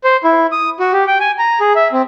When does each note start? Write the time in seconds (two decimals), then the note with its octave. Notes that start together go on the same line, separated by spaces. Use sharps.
0.04 C5
0.24 E4
0.52 D#6
0.80 F#4
0.93 G4
1.07 G5
1.20 G#5
1.39 A#5
1.60 G#4
1.76 E5
1.93 C4